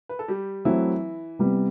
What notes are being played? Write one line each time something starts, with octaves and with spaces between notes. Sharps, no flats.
B4
A4
G3 G4
E3 F#3 A3 C4 E4
C3 G3 B3